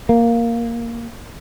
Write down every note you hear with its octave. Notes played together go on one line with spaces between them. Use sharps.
A#3